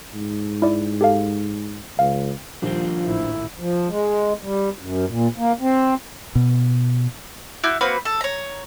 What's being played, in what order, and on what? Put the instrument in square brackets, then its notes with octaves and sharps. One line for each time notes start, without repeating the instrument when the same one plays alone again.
[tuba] G#2
[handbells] E4 D5
G4 A4 F5
[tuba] C#2 [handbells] F5
[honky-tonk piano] D#2 A#2 G3 [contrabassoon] F3 [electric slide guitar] D4 C5
[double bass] A1 E4
[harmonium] F3
G#3
G3
F#2
A#2
A#3
C4
[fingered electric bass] B2
[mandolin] E4 F#4 D6 G6
A#3 C4 F#4 B4
A4
C#5 A#5